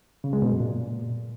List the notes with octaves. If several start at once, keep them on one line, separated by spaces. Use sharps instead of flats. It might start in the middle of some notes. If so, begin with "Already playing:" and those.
C#3
G#3
B2
F#2
A#2